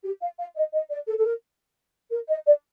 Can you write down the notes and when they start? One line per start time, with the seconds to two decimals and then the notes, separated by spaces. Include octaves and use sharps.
0.04 G4
0.21 F5
0.39 F5
0.56 D#5
0.74 D#5
0.91 D5
1.08 A4
1.18 A4
1.26 A#4
2.11 A#4
2.29 D#5
2.46 D5